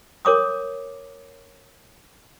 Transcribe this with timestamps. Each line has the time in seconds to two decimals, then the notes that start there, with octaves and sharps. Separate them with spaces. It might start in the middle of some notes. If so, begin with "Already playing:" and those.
0.25 A#4 C#5 D6 D#6